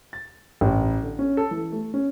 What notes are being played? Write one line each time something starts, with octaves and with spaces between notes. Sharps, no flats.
A6
A1
D3
C#4
A4
E3
A3
C#4